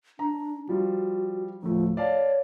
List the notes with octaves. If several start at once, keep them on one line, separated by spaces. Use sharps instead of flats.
D4 A#5
F3 G3 F4 F#4
D2 A2 F3 A3
C#5 D5 F5 A5